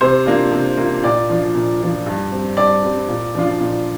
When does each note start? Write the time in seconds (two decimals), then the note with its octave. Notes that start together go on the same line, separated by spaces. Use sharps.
0.01 C3 C5
0.26 A#3 D4 F4
0.51 C3
0.77 A#3 D4 F4
1.03 A#2 D5
1.29 F3 D4 F4
1.55 A#2
1.81 F3 D4 F4
2.06 G2
2.32 G3 C4
2.57 G2 D5
2.83 G3 C4
3.08 A#2
3.35 F3 D4 F4
3.61 A#2